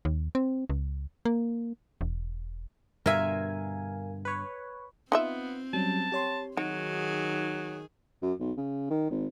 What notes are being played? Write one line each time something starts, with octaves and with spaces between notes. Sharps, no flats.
D#2
C4
C#2
A#3
E1
G2 B2 D3 F4 A#4 E5 F5 G#5
B4 C#5
B3 C4 D#4 F4 E5
F#3 G3 C#4 A5
G4 C#5 C6
D#3 F#3 D#4 F#4 G#4
F#2
B1
C#3
D#3
G#1